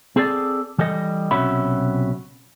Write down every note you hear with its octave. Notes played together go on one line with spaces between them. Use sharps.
C4 G#4 A4 B4 D5
E3 G3 A4 D#5
B1 C3 C#4 F#4 E5 B5